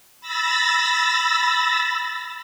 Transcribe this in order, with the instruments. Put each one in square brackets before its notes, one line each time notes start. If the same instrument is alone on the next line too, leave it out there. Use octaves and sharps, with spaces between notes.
[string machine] B5 E6 A6 A#6